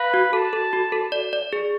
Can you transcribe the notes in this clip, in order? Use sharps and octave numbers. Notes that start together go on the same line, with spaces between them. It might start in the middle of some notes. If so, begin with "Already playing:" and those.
Already playing: B4 F5
F#4
A4 A5
A4
F#4
A4
D5
D5
G#4